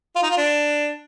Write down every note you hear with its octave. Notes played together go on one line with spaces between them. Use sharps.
F4
D#4
F4
D4